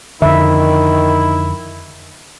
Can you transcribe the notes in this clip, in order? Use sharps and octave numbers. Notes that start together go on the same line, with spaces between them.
F2 D3 D#3 E4 E5